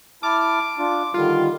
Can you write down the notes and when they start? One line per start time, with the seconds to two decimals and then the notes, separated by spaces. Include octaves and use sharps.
0.23 E4 A5 D6 F6
0.78 D4 F4
1.14 D3 D#3 G3 F4